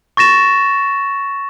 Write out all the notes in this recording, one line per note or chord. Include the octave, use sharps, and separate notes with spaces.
C#6 A6 A#6 E7